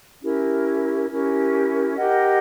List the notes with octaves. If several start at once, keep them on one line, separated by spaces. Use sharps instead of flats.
C#4 E4 G4 A#4
C#4 E4 G4 A#4
G4 A#4 D#5 F#5